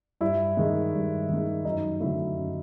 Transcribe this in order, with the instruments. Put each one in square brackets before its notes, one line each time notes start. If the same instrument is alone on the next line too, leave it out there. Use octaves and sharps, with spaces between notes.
[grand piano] G2 E4
D#3 G#3
G2
D#3 G#3
F#2 D#4
D3 F#3 A3 E4
F#2